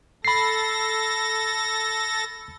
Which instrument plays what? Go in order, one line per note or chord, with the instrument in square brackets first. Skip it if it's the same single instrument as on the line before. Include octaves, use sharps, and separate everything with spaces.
[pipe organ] A4 A6 A#6 [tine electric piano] B5 C7